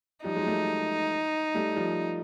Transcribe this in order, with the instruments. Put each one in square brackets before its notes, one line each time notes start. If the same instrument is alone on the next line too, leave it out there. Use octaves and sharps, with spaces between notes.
[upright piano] F3 G3 [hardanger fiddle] D#4
[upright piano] F#3 G#3
G3 A3
G3 A3
F3 G3